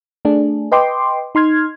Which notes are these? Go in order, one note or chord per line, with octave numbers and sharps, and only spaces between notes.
A3 D4 G#4
B4 D#5 G5 C6 D6
D#4 C6 F6 G#6